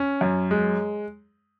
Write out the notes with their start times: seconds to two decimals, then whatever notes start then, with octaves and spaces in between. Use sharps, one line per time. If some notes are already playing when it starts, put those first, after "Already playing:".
Already playing: C#4
0.21 F#2
0.51 G#3